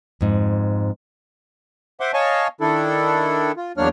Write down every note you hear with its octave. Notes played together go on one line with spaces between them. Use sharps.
F2 G#2
C5 E5 F#5 C6 D6
C#5 D#5 F5 G#5 A5 C#6
D#3 D4 E4 A4
F4
E2 F#3 A#3 D4 C#5 F6